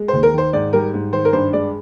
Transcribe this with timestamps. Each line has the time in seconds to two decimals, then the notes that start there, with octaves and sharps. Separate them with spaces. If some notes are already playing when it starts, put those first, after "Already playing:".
Already playing: G#3
0.08 D#2 C5
0.23 A#4
0.33 D#3 C5
0.53 G#2 D5
0.73 G3 A#4
0.94 G#2
1.13 D#3 C5
1.25 A#4
1.33 G2 C5
1.53 G#3 D5